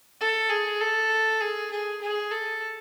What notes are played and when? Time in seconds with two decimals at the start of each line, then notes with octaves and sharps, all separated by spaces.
0.20 A4
0.50 G#4
0.81 A4
1.41 G#4
1.71 G#4
2.01 G#4
2.31 A4